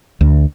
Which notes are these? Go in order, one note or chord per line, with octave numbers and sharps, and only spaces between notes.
D2